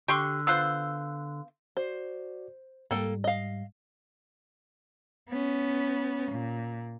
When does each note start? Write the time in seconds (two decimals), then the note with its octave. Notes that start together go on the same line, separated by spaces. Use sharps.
0.08 D3 G4 C6 C#6
0.47 B3 F4 C5 E6 F#6
1.77 F#4 C5 D5
2.91 G#2 G3 A#3 A4 G5
3.24 D#5 F5
5.29 B3 C#4
6.32 A#2